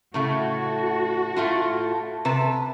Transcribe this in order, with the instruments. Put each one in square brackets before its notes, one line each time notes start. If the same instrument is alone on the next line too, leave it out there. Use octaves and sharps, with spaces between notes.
[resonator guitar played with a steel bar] A2 C#3 A3 [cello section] F#4
[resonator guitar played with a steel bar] A2 A3 F4
C3 B4 A5